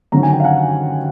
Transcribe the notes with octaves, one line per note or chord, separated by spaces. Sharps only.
G1 F#2 D#3 F#3 A#5
G#5
G5
F5
F#5